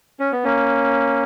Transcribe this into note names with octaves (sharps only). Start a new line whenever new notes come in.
C#4
B3
A#3 C#4